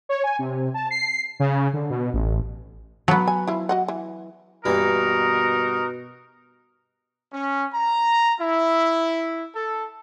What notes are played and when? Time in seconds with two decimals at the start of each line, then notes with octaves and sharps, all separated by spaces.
0.09 C#5
0.24 G#5
0.39 C3
0.74 A5
0.91 C7
1.40 C#3
1.73 D3
1.90 B2
2.13 A1
3.08 F#3 B3 A5
3.27 G#5
3.47 F3 E4
3.69 F#4 D#5 F#5
3.88 E3
4.65 G2 B2 E3 A#3 D#4 F#4 A#4
7.32 C#4
7.73 A#5
8.40 E4
9.55 A4